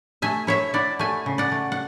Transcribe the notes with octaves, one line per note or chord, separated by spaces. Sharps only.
A3 E5 G#5
E4 C#5 E5
E4 D5 F#5
A3 E5 G#5
C#3
D5 F#5
A3
F#5